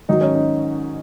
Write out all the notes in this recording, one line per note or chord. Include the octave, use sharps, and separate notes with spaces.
G#2 D#3 F#3 D#4
C#4
D#4